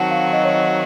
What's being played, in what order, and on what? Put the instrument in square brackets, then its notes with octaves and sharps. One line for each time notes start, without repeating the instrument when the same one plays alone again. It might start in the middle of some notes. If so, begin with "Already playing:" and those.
Already playing: [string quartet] D#3 F#3 C4 F#4 [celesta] F#5 A5
[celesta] F5
D#5
C#5
D#5